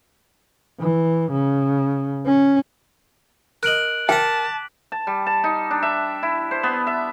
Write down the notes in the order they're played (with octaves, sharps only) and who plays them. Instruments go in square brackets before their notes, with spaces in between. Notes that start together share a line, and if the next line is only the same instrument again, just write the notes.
[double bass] E3
C#3
C#4
[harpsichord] A#4 D#5 [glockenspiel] F#6 D7 F#7
[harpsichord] A#4 A#5 [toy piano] G5 [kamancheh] A5 [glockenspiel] D6 B6
[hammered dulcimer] A5
G3
A5
D#4
D4
E5
E4
C5
B3
E5